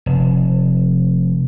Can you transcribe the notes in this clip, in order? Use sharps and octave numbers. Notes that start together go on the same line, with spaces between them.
F1